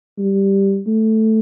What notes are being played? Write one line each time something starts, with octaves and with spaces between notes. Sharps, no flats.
G3
A3